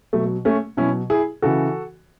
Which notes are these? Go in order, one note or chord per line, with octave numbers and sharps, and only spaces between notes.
B2 F#3 A3
A3 C#4
B2 F#3 C#4 E4
E4 G#4
C#3 E3 F#4 A4